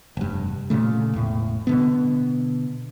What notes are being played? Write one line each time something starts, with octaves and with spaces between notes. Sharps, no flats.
F1 G2
A#2 C#3 A3
E1 A2
B2 D3 B3